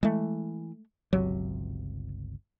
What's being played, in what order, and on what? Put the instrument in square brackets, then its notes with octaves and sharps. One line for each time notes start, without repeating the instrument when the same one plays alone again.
[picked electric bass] E3 [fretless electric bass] G#3 A3
[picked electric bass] G1 C#2 C3 [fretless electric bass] F#3